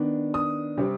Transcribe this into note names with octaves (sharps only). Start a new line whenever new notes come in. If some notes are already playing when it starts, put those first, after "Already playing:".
Already playing: D#3 B3 D4
D#6
C3 G3 C4